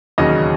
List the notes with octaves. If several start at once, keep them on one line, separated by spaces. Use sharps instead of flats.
E1 D#2 C#3 F#3 C#4 D#5